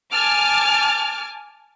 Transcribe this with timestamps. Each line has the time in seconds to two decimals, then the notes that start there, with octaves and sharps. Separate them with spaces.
0.13 G#5 A5 D6 F6